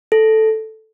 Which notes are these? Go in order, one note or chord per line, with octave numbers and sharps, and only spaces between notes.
A4